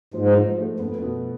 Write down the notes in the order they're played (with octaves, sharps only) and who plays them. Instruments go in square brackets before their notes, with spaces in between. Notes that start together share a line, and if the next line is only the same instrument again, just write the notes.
[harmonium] G#2 [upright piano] F3
[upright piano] F3
A3
[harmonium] G2 [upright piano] B3
[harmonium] F#2
[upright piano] B2